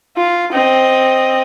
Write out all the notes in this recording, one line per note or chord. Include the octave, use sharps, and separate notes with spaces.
F4
C4 D#5